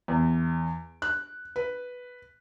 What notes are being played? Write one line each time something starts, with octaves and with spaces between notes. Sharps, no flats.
E2
F#6
B4